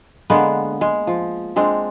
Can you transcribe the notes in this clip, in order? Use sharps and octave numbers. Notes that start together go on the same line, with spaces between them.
D3 G#3 A#3 B3
G#3
F3
G#3 C4 D4